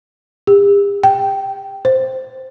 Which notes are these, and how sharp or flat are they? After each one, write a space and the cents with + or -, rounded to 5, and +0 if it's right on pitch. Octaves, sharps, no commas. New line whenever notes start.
G4 +45
G5 -10
C5 +0